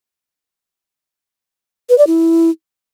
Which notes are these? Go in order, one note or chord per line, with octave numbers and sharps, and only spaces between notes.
B4
D5
E4